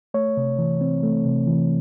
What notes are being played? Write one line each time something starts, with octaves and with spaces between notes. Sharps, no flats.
A3 C#5
C3
E3
C4
A3
C3
E3